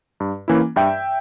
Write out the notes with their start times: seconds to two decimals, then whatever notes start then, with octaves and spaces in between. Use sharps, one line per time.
0.20 G2
0.48 E3 A#3 C#4 E4
0.76 G2 E5 G5